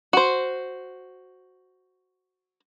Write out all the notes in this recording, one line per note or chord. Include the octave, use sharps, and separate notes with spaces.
F#4 C5